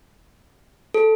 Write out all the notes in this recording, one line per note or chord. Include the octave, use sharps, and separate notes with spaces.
A4